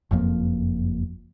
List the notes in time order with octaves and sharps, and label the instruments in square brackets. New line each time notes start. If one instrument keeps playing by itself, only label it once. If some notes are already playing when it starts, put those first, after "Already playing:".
[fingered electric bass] F#1 F2 F3 A#3